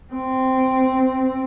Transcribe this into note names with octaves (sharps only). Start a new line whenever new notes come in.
C4